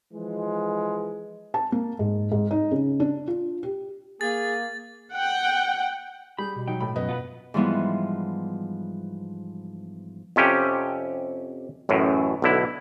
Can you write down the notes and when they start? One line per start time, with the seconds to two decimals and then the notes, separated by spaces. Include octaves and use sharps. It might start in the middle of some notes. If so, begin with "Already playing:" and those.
0.13 E3 F3 G#3
1.54 A5
1.72 A#3
1.99 G#2
2.32 G#2
2.51 D#4
2.71 C#3
3.00 D4
3.27 F4
3.63 G4
4.21 A#3 G#4 A6
5.14 F#5 G5
6.39 G3 G#4 B5 G6
6.56 B2
6.68 F#3 D#4 G5
6.80 A2 B5
6.96 F#2 B3 D#5
7.09 F4 A4 B4 F#5
7.54 G#2 E3 F3 G3 B3 E4
10.36 F2 C3 C#4 G4
11.89 A1 F#2 A2
12.42 B1 D3 E4